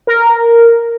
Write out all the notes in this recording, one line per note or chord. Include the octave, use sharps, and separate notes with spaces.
A#4